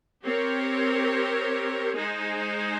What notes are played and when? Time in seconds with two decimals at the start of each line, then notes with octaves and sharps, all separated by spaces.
0.25 C4 G4 A#4 C#5
1.96 G#3 D#4 G#4 C5